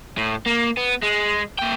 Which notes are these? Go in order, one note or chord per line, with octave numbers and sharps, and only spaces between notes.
A2
A#3
B3
G#3
A#2 G5